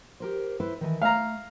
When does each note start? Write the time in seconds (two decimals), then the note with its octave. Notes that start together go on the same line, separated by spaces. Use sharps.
0.20 G4 A#4 C5
0.60 E4 B4 C5
0.81 D#3 E3 G#5
1.02 A3 F5 A#5